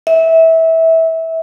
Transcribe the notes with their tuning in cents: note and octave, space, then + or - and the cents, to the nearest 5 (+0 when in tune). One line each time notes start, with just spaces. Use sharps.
E5 -20